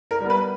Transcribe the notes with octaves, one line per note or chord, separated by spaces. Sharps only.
A#4
G3 B3
B4